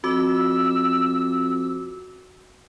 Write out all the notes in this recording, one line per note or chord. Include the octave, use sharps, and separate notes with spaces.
F2 F#4 D6 E6